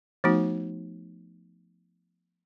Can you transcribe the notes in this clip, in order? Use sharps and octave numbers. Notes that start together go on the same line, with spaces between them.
F3 A3 B3 D#4 F#4